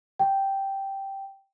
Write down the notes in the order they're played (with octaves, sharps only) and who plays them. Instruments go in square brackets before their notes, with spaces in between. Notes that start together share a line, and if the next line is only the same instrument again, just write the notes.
[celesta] G5